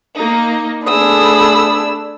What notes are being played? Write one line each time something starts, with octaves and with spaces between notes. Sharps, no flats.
A#3 D#4
A3 D4 G#4 B5 D#6 E6